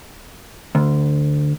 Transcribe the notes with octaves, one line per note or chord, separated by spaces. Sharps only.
D2